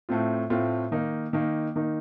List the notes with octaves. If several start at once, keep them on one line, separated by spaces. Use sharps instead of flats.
A2 A3 C4 F4
A2 A3 C4 F4
D#3 A#3 D#4
D#3 A#3 D#4
D#3 A#3 D#4